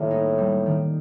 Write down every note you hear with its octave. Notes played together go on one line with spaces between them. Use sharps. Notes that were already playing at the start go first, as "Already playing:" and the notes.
Already playing: A2 D#3 G3 A#3
D#4
G3
D#3